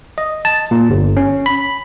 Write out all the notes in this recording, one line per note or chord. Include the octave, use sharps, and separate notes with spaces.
D#5
A5
A#2
G1
C#4
B5